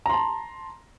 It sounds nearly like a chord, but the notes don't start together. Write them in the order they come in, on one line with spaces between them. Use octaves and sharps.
A#5 C6 A5